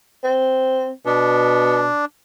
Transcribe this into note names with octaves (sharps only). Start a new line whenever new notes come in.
C4
B2 D4